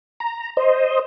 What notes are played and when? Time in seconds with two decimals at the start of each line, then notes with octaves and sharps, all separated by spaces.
0.20 A#5
0.57 C5 D#5